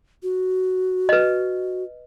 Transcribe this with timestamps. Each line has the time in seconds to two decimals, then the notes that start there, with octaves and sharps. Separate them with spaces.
0.23 F#4
1.09 B4 D#5